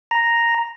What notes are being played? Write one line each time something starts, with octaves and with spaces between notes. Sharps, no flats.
A#5